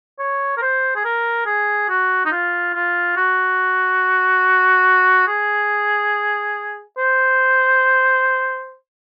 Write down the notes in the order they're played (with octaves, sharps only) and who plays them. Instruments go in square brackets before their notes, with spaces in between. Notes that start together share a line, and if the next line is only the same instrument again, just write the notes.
[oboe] C#5
A#4
C5
G#4
A#4
G#4
F#4
D#4
F4
F4
F#4
G#4
C5